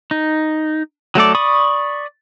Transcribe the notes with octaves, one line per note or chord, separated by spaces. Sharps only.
D#4
F#3 A3 A4 D5
D5 B5 C#6 D#6